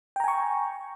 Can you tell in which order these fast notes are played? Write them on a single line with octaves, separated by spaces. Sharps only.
G5 A#5 G#5 C#6